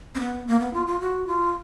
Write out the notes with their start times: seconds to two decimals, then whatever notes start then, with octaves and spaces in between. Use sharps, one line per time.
0.15 C4
0.20 B3
0.47 A#3
0.60 B3
0.74 F4
0.87 F4
1.01 F#4
1.27 F4